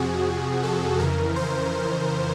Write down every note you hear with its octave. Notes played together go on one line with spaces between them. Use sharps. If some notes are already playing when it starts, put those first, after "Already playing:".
Already playing: F2 C3 F3 F#4 G#4
A4
F2 C#3 E3 A#4
C5